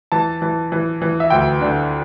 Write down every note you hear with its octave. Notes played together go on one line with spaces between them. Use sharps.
E3 A5
E3
E3
E3
E5
D2 G5
D3